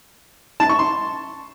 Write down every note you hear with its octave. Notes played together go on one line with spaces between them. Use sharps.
A5
C#6
C6